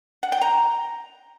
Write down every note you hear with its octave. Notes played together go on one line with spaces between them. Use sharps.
F#5
G5
A#5